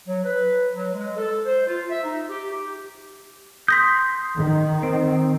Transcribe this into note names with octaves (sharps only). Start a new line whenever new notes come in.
F#3
B4
F#3
G#3
A4
C5
F4
E5
D#4
G4
G4
C6 D#6 G6 A#6 B6
D#3
C4